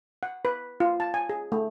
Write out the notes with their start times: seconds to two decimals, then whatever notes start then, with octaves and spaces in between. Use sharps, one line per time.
0.23 F#5
0.45 B4
0.80 F4
1.00 A5
1.14 G#5
1.29 G#4
1.52 A3